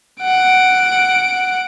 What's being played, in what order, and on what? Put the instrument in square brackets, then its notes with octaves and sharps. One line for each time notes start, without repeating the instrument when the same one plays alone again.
[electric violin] F#5 D7